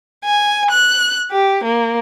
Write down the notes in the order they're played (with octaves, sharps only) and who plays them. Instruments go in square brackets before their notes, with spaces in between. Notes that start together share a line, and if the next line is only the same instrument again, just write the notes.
[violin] G#5
F#6
G4
A#3